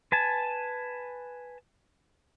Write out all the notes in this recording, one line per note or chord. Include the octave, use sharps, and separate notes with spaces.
B4 G#5 A5